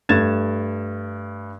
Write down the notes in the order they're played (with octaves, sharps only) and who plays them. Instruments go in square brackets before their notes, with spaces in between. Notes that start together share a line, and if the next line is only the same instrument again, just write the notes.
[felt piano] G2 A3 G#6 A6 E7